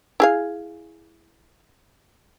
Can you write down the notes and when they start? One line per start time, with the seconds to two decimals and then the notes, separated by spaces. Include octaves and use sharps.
0.20 E4 G#4 F5